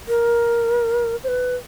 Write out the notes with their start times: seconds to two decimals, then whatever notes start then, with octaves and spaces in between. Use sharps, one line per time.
0.08 A#4
1.24 C5
1.28 B4